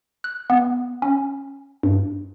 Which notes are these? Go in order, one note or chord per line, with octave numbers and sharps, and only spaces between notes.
F#6
B3
C#4
G2